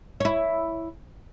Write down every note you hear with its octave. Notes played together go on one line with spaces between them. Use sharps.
E4 C#5